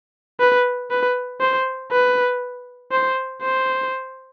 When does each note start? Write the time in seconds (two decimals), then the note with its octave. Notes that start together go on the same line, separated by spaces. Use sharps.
0.40 B4
0.90 B4
1.41 C5
1.91 B4
2.92 C5
3.42 C5